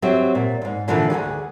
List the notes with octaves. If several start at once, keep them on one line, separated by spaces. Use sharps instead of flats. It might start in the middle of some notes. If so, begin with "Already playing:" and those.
F#3 C4 G4 E5
A#2
F2 G#2
A#2 D3 E3 F3 A#3
D2 B2 G#4 F#5